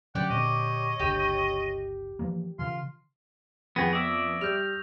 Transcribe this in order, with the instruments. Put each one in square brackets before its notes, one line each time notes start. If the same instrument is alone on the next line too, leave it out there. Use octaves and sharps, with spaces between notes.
[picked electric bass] D3 F#3 C#4 [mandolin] G4 D5 [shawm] F#5
[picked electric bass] A#2 D3 C4 [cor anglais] C#5 [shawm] D#5
[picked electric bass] G1 C#2 D3 [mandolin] G4
[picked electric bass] E3 F3 A#3
[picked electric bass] C#3 E3 [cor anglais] F4 [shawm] C6
[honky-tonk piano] F2 [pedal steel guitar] B3 G#4 [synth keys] F#5 G5 [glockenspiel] C#6 G#6 A#6
[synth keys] B3 [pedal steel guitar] D5 E5 [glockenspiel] D#6 E6
[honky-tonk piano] G3 [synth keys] F6 [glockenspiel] G6 F7